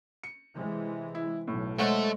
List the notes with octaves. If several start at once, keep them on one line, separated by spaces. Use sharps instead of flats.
C#7
C3 E3 G#3
E4
B1 A2
G#3 A3 C5 C#5 F#5